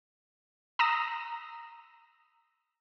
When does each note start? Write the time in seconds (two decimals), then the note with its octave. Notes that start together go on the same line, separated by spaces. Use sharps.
0.79 A#5 D#6 E6 A#6 E7